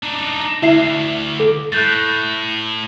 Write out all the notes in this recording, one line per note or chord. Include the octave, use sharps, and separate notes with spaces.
D4 D#4
D2 E4 E5 C7
A4
A2 F#6 G6 A6